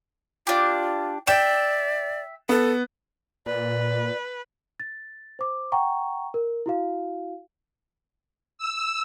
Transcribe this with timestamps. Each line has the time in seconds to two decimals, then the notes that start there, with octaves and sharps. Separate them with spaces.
0.47 D4 F4 G4
1.27 D5 E5 G5 E7
2.49 B3 A4
3.46 A#2 B4 D5
4.80 A6
5.39 C5 D6
5.72 F#5 G5 A#5 C#6
6.34 A#4
6.66 E4 F#4 F5
8.58 E6